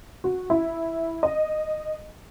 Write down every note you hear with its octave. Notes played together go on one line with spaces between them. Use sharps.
F#4
E4
D#5